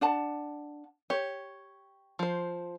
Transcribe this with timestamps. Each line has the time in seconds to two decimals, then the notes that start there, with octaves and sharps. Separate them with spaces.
0.01 D4 F#5 A5
1.10 G4 C#5
2.19 F3 C5